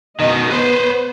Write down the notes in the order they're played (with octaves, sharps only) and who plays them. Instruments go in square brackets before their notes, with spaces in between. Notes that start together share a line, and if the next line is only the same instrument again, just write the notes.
[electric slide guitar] B2 D#3 [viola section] D#5
[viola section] B3 [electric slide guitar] B4 C5